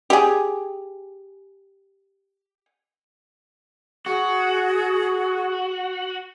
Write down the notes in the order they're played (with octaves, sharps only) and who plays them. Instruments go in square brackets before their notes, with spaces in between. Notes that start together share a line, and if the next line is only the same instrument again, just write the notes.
[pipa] G4 G#4
[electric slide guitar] F#4 [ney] G#4